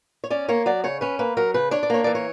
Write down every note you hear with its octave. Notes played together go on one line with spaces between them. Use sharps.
C#5
C#4 D5
A#3 C#5
F#3 D5
C#3 C#5
C#4 B4
A#3 B4
F#3 A#4
C#3 B4
D4 C#5
D5
A#3 C#5
E3 D5
C#5